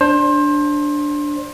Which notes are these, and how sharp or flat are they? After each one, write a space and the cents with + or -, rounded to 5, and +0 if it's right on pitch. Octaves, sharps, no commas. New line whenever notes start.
D4 +0 C5 +25